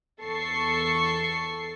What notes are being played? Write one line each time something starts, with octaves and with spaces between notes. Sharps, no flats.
E2 A4 C#6 C7